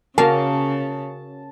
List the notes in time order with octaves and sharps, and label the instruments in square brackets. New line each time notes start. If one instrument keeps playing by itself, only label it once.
[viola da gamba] C#3 [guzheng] A#3 C#4 F5 [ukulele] F#4 A#4 [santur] A5